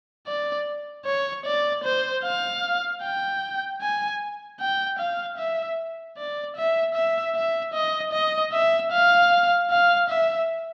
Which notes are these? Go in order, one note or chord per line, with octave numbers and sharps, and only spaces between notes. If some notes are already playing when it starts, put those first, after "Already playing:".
D5
C#5
D5
C5
F5
G5
G#5
G5
F5
E5
D5
E5
E5
E5
D#5
D#5
E5
F5
F5
E5